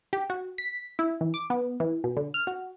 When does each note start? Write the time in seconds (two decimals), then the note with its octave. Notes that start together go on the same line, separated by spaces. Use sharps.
0.13 G4
0.30 F#4
0.58 B6
0.99 E4
1.21 E3
1.34 D6
1.50 B3
1.80 E3
2.04 B2
2.17 D3
2.34 F6
2.47 F#4